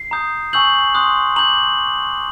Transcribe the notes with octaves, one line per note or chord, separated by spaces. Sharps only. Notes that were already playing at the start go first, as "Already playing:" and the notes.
Already playing: C7
A#5 D#6 G6
G#5 C#6 E6 G6 F#7
C6 D#6 F#6
A#5 D6 G6 F#7